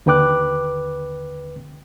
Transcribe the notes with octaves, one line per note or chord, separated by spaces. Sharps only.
D#2 D3 B4 G5 D6 F#6